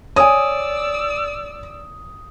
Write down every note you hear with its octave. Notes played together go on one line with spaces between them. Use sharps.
C#5 D5 G#5 D#6 E6